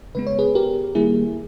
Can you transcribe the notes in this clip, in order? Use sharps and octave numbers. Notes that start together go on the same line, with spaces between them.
C#3 G#3 B3 B4
C#5
G#4 B4
G4 A#4
D#3 G3 A#3 E4 G#4